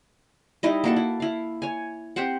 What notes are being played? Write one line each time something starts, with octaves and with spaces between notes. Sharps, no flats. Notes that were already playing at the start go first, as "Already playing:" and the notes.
G3 D#4 E4 D#5
A#3 F#4 A4
E4
E4 F5
C#5 G#5
C4 G4 C5 F#5